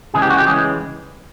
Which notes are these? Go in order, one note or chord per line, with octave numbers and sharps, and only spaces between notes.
C#3 E3 G#3 G#4
G4
F#4
G4
C#3 E3 G#3 G#4